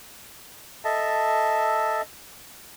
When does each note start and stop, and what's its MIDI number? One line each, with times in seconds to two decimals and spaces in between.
0.85 2.02 69
0.85 2.02 75
0.85 2.02 76
0.85 2.02 81